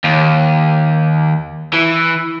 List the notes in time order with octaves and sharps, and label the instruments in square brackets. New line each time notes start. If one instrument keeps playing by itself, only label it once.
[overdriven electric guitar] D#2
E3